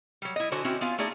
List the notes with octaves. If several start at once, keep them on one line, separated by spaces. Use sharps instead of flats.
F#3 G3
E4 D#5
D3 F#4 C5 G#5
C4 C#4 E4 F#4
B3 F4 F5 G#5
A3 D#4 G#4 D5